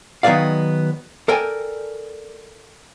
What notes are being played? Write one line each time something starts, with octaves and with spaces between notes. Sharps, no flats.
D#3 F#3 B3 G#4 D5 F5
A4 A#4 D5 G5 G#5